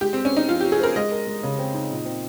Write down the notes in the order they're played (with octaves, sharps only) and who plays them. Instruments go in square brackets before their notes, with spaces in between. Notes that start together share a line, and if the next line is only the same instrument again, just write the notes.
[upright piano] G#3 [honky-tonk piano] G4
[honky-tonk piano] C4
[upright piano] G4
[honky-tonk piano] C#4
[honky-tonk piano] D#4 [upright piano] C5
[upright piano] F3 [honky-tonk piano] F4
[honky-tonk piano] G4
[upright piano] F4
[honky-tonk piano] G#4
[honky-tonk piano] A#4 [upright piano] C5
[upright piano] G#3 [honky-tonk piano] D#5
[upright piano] A#4
G#3
C#3
C4
D#4
A#2
C4